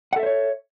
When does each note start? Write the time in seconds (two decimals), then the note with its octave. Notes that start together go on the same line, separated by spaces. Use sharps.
0.13 F#5
0.16 A4
0.19 E5
0.23 C5
0.26 C#5